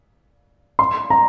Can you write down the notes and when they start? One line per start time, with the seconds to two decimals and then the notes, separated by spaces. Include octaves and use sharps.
0.79 C6
1.10 A#5